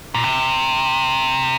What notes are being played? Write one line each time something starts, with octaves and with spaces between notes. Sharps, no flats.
A#2
C3